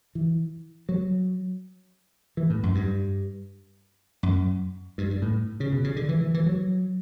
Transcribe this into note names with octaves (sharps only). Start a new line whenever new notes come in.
E3
F#3
E3
A2
F#2
G2
F#2
G2
G2
A2
C#3
B2
C#3
D3
E3
E3
E3
F#3